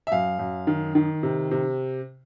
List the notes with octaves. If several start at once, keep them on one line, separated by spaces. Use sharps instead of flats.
E5
F#2 F5
F#2
D#3
D#3
C3
C3